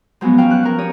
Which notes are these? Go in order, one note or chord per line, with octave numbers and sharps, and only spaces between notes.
F3 F#3 G#3 B3 C#4
C#4 F#4 C#5 F5 G5
F#3 F#6
F3 A#4
G4 C#5 D#6